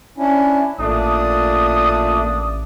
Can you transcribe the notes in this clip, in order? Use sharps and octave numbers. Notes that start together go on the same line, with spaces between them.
C#4 D4 E4
A1 A#2 A3 D4 D#6